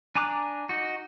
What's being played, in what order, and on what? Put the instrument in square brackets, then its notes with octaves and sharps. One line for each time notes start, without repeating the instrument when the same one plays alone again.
[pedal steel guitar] D4 G#5 A#5 D6 F#6
D#4 F#4